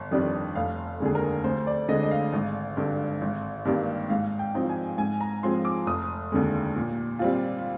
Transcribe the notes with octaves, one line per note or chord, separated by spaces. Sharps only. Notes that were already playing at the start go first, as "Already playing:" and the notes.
Already playing: G1
F2 D#3 G3 D4
F1 F5
D#2 D3 G#3 G#4
A#4
D2 C5
D5
D3 G#3 D#5
D#5
F5
G#1
G2 D3
G#1
G2 D#3 G3 A#3
G#2 F5
G5
F3 C4 D#4
G#5
G#2 G#5
A#5
F3 G#3 C4 F4 C6
D6
F1 D#6
D#2 D3 G#3
A#2
G3 C4 F4